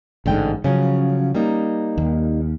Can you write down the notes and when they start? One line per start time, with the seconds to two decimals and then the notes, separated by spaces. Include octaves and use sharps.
0.26 A1 G#2 B2 D3 G5
0.64 C#3 F3 F#3 C#4
1.35 G3 A#3 D#4
1.98 D#2